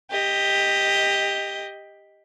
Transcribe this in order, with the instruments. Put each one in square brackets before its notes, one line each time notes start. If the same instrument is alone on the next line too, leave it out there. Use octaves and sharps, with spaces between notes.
[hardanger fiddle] G4 D#5